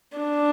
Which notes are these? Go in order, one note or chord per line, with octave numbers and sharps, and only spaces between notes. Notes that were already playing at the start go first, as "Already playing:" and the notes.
D4